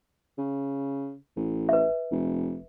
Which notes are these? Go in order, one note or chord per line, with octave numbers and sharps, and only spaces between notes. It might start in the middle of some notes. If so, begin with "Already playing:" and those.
C#3
A1
B4 E5
F1